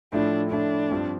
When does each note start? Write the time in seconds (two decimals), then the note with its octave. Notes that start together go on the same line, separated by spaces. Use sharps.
0.12 A2 F3 A3 D4 E4
0.51 A2 F3 A3 D4 E4
0.91 G2 F3 C4 F4